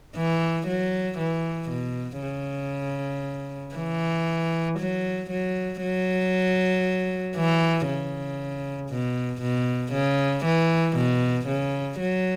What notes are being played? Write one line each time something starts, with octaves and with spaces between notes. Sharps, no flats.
E3
F#3
E3
B2
C#3
E3
F#3
F#3
F#3
E3
C#3
B2
B2
C#3
E3
B2
C#3
F#3